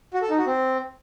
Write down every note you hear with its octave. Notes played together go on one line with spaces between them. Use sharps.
F#4
A4
D#4
F#4
C4